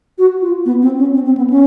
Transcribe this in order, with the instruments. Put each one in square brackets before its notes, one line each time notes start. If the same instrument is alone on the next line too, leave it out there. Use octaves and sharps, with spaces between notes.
[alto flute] F#4
F4
B3
C4
C#4
C4
C4
B3
C#4